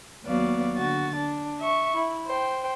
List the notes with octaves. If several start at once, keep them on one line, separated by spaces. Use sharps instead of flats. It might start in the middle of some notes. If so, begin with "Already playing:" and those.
D#2 F#3 B3 F#4 D5 F5
D3 F#4 A6
D4
E5 C#6
E4
C5 G5